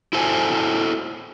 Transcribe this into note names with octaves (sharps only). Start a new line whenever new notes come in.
E4 F#4 A4 C5 F5 G#5